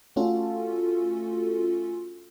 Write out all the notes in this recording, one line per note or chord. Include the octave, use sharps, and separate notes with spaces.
A3 C#4 F4 F#4 A4